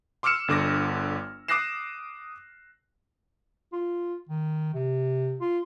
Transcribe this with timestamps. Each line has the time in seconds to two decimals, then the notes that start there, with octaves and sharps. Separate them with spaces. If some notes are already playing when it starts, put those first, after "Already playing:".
0.23 C6 D6 E6 F6 C#7 E7
0.48 G1 D3 D6 A#6
1.48 D6 D#6 F#6 A#6 C7 E7
3.72 F4
4.29 D#3
4.74 C3
5.40 F4